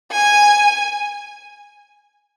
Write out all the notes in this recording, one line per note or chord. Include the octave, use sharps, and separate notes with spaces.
G#5